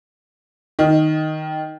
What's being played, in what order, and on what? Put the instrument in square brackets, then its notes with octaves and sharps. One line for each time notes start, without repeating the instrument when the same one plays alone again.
[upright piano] D#3